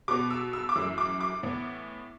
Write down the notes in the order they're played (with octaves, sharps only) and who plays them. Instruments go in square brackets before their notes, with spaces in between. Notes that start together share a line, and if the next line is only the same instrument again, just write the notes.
[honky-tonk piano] B2 B3 D6
E6
E6
D6
F#2 E3 A3 E6
D6
D6
A2 E3 B3